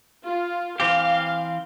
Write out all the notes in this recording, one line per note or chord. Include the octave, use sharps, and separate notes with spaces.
F4
E3 C4 G4 F5